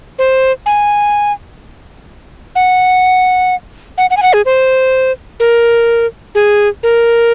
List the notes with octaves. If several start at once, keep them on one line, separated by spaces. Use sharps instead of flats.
C5
G#5
F#5
F#5
F#5
G#5
F#5
G#4
C5
A#4
G#4
A#4